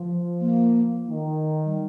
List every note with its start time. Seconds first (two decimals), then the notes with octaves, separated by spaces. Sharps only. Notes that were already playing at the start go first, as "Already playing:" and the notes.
Already playing: F3
0.41 A#3
1.08 D#3
1.66 G3